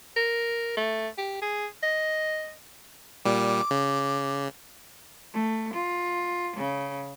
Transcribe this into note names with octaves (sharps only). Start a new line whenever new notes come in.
A#4
A3
G4
G#4
D#5
A#2 G3 D6
C#3
A3
F4
C#3